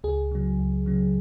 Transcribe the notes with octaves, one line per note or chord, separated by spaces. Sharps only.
C#2 G#4
C#3 F#3
C#2
C#3 F#3